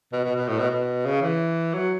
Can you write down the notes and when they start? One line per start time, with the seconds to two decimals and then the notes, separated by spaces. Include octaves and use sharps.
0.12 B2
0.24 B2
0.35 B2
0.48 A2
0.58 B2
0.71 B2
1.06 C#3
1.22 E3
1.73 F#3